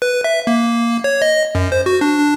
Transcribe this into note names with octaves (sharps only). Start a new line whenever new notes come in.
B4
E5
A#3
C#5
D#5
F#2
C5
F#4
D4
D4